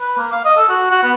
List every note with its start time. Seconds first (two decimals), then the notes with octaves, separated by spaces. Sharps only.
0.01 B4
0.18 A#3
0.32 F5
0.45 D#5
0.57 A4
0.69 F#4
0.91 F#4
1.03 B3